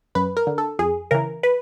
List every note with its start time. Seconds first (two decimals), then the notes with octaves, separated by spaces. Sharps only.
0.15 F#2 B4
0.37 A#4
0.47 D3
0.58 A4
0.79 F2 G#4
1.11 C#3 E3 A#4
1.43 B4